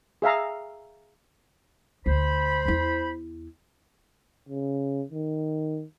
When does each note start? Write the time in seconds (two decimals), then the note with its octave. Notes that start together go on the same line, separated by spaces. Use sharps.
0.22 G#4 E5 F5 A#5
2.06 D2 C5 B5
2.65 E2 E4
4.49 C#3
5.12 D#3